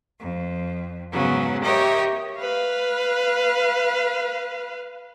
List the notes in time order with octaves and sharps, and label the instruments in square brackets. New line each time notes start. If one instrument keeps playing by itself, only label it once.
[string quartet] F2
G#2 C#3 F#3 B3
G4 A#4 C#5 D#5 E5 G5
[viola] B4 F5